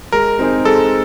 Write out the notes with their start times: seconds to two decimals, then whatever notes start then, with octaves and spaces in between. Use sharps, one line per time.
0.12 G#3 A#4
0.39 C4 D#4 G#4
0.65 G#3 A4